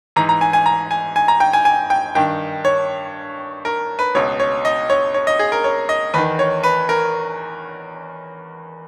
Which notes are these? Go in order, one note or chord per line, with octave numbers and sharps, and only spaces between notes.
G#2 E3 A#5
A#5
G#5
G#5
A#5
G#5
G#5
A#5
G5
G#5
G#5
G5
G2 D#3 G5
C#5
A#4
B4
C#2 B2 C#5
C#5
D#5
C#5
C#5
D#5
G#4
A#4
C#5
D#5
E2 D#3 B4
C#5
B4
A#4